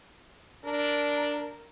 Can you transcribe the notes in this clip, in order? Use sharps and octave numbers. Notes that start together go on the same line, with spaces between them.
D4 A#4